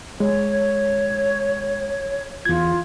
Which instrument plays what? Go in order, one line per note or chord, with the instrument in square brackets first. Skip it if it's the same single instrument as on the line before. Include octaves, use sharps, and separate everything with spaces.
[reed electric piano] G#3 [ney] C#5
[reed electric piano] E2 G#6 [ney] F4